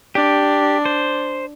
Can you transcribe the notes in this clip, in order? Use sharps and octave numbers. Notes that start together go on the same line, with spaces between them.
D4 G4
C5